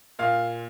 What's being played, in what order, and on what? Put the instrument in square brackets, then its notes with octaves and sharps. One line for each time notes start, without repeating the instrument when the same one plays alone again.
[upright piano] A#2 F5